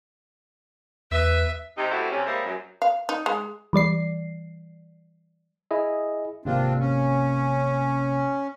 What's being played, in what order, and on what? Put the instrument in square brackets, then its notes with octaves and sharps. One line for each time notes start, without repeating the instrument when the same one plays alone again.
[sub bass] E2 [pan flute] B4 [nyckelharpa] E5
[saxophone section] C3 D#4
B2 G3 A3 C4 E4 F#4
C3 C#4
G3 G#3 A#3 E4 C5 E5
F#2
[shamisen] F5
D#4
G#3
[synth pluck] E3 G3 D5 C7
[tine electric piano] E4 G#4 D#5
[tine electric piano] G#1 C3 A#3 [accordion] C4 D4 F4
[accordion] C#4